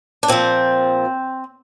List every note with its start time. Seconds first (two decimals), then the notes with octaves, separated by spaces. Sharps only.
0.23 D4
0.28 A#2 F3 C4